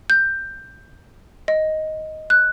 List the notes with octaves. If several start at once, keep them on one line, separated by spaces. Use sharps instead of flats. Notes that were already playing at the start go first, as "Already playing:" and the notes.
G6
D#5
F#6